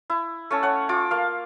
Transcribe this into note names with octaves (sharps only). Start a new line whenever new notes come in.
E4
A3 C#4 A5
C#5 F#5
F4 D6
A#3 F5